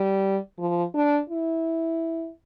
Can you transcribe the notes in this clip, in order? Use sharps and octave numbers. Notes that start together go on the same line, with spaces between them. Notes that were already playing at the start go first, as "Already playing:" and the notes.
Already playing: G3
F3
D4
E4